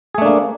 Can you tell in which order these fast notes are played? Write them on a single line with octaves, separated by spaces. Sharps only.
G#4 A3 D4 A#3